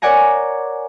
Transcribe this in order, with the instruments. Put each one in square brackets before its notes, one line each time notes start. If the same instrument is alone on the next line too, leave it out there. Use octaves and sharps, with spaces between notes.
[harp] A#4 C#5 D5 F#5 G#5 A#5